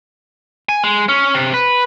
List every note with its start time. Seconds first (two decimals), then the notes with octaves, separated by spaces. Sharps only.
0.69 G#5
0.84 G#3
1.09 C#4
1.34 C3
1.54 B4